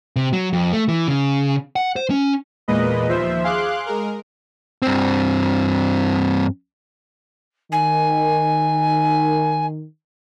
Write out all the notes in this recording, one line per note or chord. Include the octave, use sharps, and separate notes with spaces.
C3
F#3
F2
A3
E3
C#3
F#5
C5
C#4
E2 A#2 G#3 A#3 B4 D#5
D#2 F3 C5 E5
G#4 F5 C6 D6 F#6
G#3 A#4
G2 C4
D#3 G#5